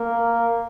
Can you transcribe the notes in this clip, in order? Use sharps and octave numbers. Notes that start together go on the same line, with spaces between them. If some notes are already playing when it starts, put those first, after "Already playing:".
Already playing: A#3